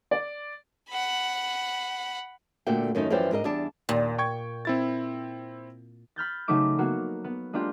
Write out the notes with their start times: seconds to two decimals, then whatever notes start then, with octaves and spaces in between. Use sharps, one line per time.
0.11 D5
0.90 F#5 B5
2.67 A#2 D3 A3 A#3 F#4 G5
2.95 F#2 D#3 A3 C#4 D#4
3.10 F#2 E3 F3 C5 D5 G5
3.31 G#2 D4 A#4 D#5
3.44 E2 G3 D4 A5
3.89 D#2 A#2
4.18 G5 C#6 G#6
4.65 C4 E4 A6
6.16 B5 F6 G6 A6
6.48 C#3 F#3 A3 D#4 D6 E7
6.78 F#3 A#3 B3 F#4
7.24 B3
7.53 G#3 A#3 D4 F4 G4